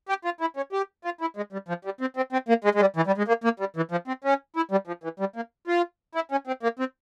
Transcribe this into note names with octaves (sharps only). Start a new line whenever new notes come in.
G4
F4
E4
C#4
G4
F4
E4
G#3
G3
F3
G3
C4
C4
C4
A#3
G#3
G#3
G3
E3
G3
G#3
A#3
A#3
G3
E3
F3
C4
C#4
E4
G3
F3
E3
G3
A#3
F4
E4
C#4
C4
A#3
C4